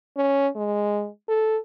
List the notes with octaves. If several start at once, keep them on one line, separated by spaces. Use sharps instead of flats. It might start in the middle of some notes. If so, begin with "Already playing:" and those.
C#4
G#3
A4